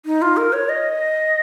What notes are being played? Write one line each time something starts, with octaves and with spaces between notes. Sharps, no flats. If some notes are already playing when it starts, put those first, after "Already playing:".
D#4
F4
A#4
C#5
D#5